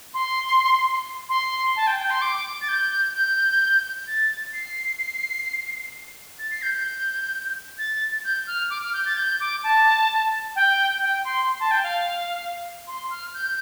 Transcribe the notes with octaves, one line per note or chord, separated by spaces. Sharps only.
C6
C6
A5
G5
G5
C6
D6
A6
G6
G6
A6
C7
A6
C7
G6
G6
A6
G6
F6
D6
F6
G6
A6
G6
D6
A5
G5
G5
C6
C6
A5
G5
F5
C6
F6
G6